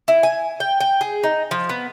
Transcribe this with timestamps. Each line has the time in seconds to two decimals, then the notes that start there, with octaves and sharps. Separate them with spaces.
0.08 E4
0.23 G#5
0.60 G5
0.80 G5
1.01 G#4
1.23 D#4
1.51 F3
1.69 B3